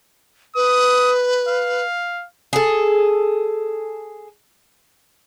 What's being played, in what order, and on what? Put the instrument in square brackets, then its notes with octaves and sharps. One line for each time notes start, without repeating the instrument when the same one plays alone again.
[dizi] B4 [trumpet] D#6
[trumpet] F5
[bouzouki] G#4 A4